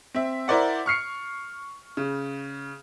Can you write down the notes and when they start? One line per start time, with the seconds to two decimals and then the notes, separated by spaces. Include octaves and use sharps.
0.14 C4 E5
0.48 E4 A#4 C5 D5 F#5
0.86 C#6 F6 C7 C#7
1.97 C#3